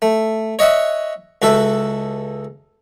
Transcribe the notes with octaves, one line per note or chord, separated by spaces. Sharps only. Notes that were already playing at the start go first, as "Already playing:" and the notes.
A3
C#5 D#5 E5 F#5
C#2 F#4 A4 E5